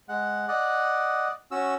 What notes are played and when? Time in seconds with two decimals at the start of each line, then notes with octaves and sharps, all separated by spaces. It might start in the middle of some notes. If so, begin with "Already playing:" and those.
0.09 G#3 F#5
0.48 D5 D#5 F#5
1.51 C#4 F#4 E6